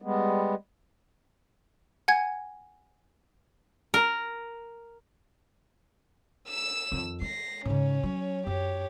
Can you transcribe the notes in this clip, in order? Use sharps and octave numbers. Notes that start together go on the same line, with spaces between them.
G3 G#3 B3
F#5 G#5 G#6
A#4
E6 E7
F2 D#3
G#3 A#6 C7
G#2 C#3 C#4 C#5
F#3
F#2 G4 C#5